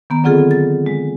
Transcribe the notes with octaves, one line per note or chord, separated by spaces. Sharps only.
D#3 B3 A#5
D3 F#3 C4 F4 G#4 A4
A6
G#3